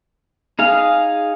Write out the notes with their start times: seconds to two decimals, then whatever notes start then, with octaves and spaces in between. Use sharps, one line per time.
0.59 D#4 G#4 F5